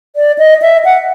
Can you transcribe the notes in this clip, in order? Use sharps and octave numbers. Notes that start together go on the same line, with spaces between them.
D5
D#5
E5
F#5